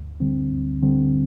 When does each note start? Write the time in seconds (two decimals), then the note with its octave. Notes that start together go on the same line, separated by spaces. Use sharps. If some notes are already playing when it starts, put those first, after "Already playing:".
Already playing: D2
0.20 D3 G3 C4
0.51 D2
0.82 D3 G3 C4